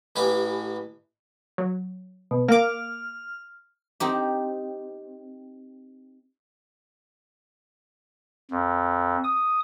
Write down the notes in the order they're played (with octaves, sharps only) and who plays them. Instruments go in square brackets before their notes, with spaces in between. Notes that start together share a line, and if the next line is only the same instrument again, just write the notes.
[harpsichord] A1 E3 G4 G#5 B5 D6
[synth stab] F#3
[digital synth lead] B2
[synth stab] A#3 D6 [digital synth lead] F6
[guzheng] C4 D#4 G4
[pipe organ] F2
D#6